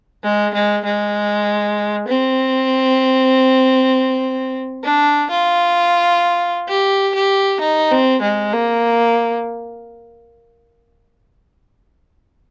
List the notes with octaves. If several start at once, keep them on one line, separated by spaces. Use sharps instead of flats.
G#3
G#3
G#3
C4
D4
F4
G4
G4
D#4
C4
G#3
A#3